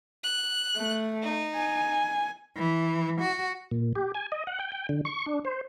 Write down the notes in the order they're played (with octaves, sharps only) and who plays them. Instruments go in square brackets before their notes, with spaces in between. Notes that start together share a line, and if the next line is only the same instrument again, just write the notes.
[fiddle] F#6
[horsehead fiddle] A3
[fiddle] D#4
[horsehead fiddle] G#5
[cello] E3
F#4
[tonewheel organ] A#2
G4
G#5
D#5
F#5
G5
G5
D3
C#6
D4
C5